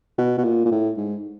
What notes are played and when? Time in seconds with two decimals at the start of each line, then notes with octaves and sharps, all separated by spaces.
0.18 B2
0.38 B2
0.44 A#2
0.65 A#2
0.72 A2
0.97 G#2